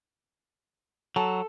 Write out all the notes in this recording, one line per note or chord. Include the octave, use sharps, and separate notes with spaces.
F#3 A4